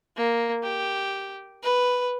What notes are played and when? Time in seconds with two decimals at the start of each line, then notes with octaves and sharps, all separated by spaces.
0.17 A#3
0.63 G4
1.63 B4